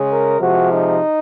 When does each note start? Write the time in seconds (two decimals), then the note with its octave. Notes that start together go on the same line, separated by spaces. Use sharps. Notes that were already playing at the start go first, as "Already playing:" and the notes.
Already playing: C#3 G#3
0.10 A#4
0.40 C3 F3 G#3 F#4
0.70 D#4